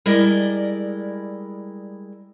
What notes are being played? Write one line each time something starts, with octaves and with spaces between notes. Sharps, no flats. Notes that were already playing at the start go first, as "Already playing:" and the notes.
G3 G#3 E4 A#4 D5 D#5